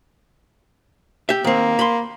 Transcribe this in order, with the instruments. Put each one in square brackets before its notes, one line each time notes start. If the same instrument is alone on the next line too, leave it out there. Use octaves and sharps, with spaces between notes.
[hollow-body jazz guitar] G4 E5
[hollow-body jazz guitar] D#3 C4 [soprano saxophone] A#3
[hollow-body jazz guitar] B5 C6